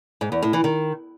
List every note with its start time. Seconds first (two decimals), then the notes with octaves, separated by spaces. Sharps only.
0.21 G#2
0.32 E2
0.42 A2
0.53 E3
0.64 D#3